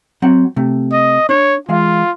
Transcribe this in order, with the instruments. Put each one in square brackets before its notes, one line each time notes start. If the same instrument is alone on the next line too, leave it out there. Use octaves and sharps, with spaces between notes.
[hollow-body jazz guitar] F#3 C4 F#5
C3 A3
[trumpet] D#5
[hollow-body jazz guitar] D4 [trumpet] C#5
[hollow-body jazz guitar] E3 G#3 F5 [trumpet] F4